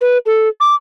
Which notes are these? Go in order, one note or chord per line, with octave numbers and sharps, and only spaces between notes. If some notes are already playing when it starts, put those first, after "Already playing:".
B4
A4
D6